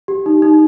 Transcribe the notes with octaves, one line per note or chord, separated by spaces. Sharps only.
G4
D#4
D#4